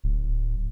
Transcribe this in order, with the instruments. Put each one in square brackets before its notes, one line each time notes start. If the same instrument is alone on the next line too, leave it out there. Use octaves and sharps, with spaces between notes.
[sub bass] D1